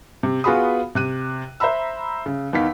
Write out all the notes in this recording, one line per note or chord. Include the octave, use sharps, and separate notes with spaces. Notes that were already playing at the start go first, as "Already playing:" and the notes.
C3
B3 F4 F#4 G#4 B5 D#6
C3 F#6 D#7
C5 E5 A#5 B5 E6
C#3
E2 D#3 F5 B6